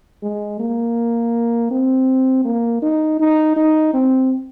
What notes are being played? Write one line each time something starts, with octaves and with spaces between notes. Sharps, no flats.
G#3
A#3
C4
A#3
D#4
D#4
D#4
C4